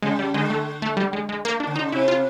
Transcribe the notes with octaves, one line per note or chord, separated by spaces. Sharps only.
C#3 G#3
G3
D3 G#3
A3
A3
G3
G#3
G#3
A#3
D4
D3
C#3 D#4
C3 E4
F4